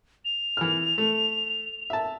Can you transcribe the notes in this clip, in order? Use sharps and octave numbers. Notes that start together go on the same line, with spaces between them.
F7
E3 F6
A3
E5 A5